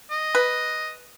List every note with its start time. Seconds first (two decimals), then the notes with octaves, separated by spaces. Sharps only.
0.11 D#5
0.35 B4